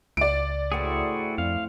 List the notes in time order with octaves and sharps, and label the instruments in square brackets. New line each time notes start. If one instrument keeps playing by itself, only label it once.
[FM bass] C#2 [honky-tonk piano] D5 D7
[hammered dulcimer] A2 C5 G5 [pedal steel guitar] E4 F#4 G#4
[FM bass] F2 [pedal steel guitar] F5